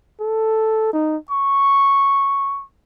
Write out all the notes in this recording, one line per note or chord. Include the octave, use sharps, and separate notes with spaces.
A4
D#4
C#6